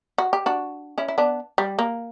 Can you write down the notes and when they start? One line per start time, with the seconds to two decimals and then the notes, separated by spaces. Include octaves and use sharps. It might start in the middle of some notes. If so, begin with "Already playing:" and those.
0.18 F#4
0.33 G4
0.46 D4 F#4
0.98 C#4 E4
1.08 E4
1.18 B3 D4
1.58 G3
1.79 A#3